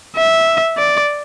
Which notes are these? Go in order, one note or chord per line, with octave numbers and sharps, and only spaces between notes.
E5
D5